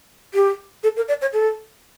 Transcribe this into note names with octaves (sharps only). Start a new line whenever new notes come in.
G4
A4
A#4
D5
C#5
A4